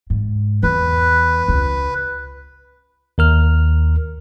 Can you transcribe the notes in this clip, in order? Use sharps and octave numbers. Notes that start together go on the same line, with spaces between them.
G#2
E2 B4
C#2
D#2 A#4 F6